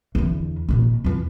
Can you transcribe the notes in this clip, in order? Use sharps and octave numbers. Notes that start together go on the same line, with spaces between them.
E2 D3
A#2 D#3
E2 F4